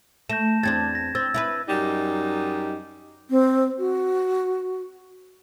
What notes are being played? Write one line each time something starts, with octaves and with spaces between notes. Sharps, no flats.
A3 G6 A#6 E7
E2 C4 D4 G#6 A6
A#6
C4 E6 A6
E4 F4 B4
F#2 G3 D#4
C4
F#4